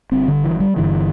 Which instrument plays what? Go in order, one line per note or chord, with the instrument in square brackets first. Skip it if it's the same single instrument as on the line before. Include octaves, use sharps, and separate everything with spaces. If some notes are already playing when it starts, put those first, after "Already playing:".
[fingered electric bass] G1 G2 D3 C4
D3
E3
G3
G1 G2 D3 E3